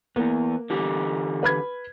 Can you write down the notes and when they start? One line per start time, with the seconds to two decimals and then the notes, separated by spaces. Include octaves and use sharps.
0.16 E2 A#3 B3
0.70 D3 E3 G4
1.43 B4 B5 G#6